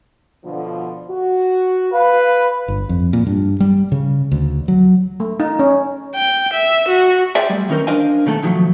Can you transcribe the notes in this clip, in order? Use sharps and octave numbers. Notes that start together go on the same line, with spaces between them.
B2 D3 F3
F#4
B4 F5
G1
F2
A#2
G2
G3
C#3
D2
F#3
A3
D#4
C#4
G5
E5
F#4
G#4 C5 D5 E5 G5 G#5
G3 A3
D#3 E3 C#4 A#4 C5
D4 A#4 C5 D#5 F5 G#5
B2 D#3 A3 A4
B2 D#3 F3 F#3 A3